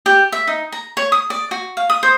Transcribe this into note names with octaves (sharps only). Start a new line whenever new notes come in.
G4
E5
D#4
A#5
C#5
D#6
D5
F#4
F5
D#6
C5